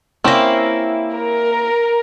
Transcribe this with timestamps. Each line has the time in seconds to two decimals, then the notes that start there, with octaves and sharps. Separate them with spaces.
0.24 A#3 C4 C#4 E4 G4
1.15 A#4